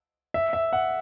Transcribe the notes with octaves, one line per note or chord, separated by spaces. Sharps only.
E5
E5
F#5